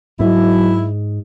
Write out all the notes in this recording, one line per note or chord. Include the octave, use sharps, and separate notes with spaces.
G#2 F#3 E4